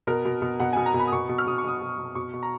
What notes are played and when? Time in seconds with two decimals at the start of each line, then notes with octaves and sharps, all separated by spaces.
0.07 B2 A#4
0.25 B2
0.42 B2
0.60 B2 F#5
0.73 B2 G#5
0.86 A#5
0.94 B2
0.99 B5
1.07 D#6
1.12 B2 C#6
1.29 B2
1.38 F6
1.46 B2 D#6
1.58 C#6
1.65 B2 D#6
1.82 B2
1.98 B2
2.15 B2 C#6
2.33 B2
2.43 A#5